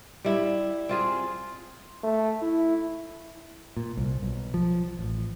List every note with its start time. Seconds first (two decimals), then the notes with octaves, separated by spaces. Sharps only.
0.24 G3 E4
0.89 C4 F4 G#4
2.03 A3
2.41 E4
3.77 A#2
3.97 C2
4.23 B1
4.54 F3
4.99 A1